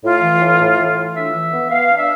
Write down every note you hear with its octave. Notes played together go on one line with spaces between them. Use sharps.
A2 F4
E3
A2
A2
E3
A2
D4 E5
E3
B3
B3 F5
D4
E5